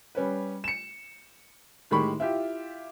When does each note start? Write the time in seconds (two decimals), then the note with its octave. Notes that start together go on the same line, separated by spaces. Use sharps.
0.15 G3 C#4 B4
0.64 C#7 E7
1.91 A2 D#3 G#3 G4 B5 C#6
2.20 E4 F4 G4